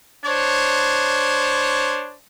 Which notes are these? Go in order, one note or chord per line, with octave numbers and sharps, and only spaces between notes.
D4 C5 C#5